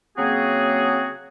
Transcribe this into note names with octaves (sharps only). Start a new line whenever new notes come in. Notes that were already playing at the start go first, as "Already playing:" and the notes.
C#3 F#3 A#3 C4 F#4 G#4